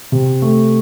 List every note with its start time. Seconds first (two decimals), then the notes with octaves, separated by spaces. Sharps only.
0.12 C3
0.42 A3